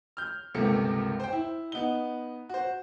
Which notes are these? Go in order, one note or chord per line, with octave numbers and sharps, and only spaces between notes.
F6 G6
G1 C#2 C3 A#3 A4 C#7
C5 G5
E4
B3 D#4 G7
F#4 C5